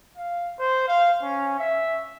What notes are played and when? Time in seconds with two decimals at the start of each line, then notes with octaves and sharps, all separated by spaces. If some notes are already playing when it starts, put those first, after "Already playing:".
0.17 F5
0.59 C5
0.88 F5
1.22 C#4
1.59 E5